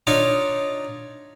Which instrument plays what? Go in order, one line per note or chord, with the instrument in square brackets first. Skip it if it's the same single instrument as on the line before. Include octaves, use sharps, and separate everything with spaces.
[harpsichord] D4 D#4 F4 C#5